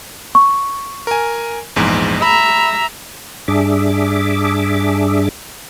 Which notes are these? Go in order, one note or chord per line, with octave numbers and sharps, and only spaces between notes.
C#6
A#4 G#5
A#1 E2 G#2
E5 A#5 B5
G2 D4 G#4 E5 D6